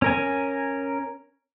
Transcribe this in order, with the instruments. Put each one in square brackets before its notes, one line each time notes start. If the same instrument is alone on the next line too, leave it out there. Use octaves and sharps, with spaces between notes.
[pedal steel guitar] C#4 A#4 G#5